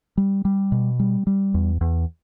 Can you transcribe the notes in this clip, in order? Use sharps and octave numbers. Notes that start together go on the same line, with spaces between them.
G3
G3
B2
G3
G3
E2
E2